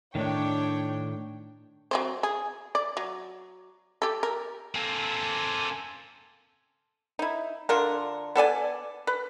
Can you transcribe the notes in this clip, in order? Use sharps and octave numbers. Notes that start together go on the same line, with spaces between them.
A2 D#3 D4 C#5 G5
F#3 C4 C5
G#4
D5
F#3
G4 A4
A#4
A#3 C4 A4 G#5
D#4 E4
D3 F4 A#4
B3 A4 D5 G#5
B4